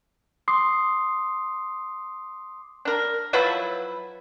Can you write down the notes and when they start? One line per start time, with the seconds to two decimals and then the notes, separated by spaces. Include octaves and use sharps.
0.48 C6 D6 D#6 C7
2.85 D4 A#4
3.33 F3 F#3 E4 B4